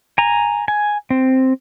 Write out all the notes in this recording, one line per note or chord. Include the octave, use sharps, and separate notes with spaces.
G#5 A#5
G#5
C4